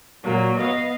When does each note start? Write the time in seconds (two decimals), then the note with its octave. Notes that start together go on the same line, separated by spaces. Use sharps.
0.23 A#2 F#3 A#3
0.57 B3 D#5 F5